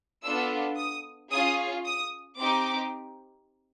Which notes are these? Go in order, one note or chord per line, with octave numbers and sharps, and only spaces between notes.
B3 D4 F4 A4 E6
D#6
C#4 F4 G#4 D#6
D#6
C4 D#4 G4 D6